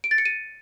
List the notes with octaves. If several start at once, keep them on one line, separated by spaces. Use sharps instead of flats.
D7
A6
C#7
D#7